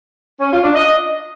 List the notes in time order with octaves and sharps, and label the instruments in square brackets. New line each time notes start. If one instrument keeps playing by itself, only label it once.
[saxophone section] C#4
F4
D4
D#5